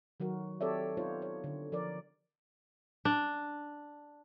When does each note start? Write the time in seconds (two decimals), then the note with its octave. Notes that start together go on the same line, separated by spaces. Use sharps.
0.20 D#3 F#3 F#4 A#4
0.61 C4 G4 A4 C#5 D5 E5
0.97 B3 D#4 F4 C5 C#5
1.22 C#5
1.44 D3
1.72 F3 A#4 D5
3.05 D4